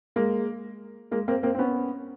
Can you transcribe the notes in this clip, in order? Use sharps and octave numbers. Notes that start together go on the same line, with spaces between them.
G#3 A#3
G#3 A#3
A#3 C4
A#3 C4
C4
B3 C#4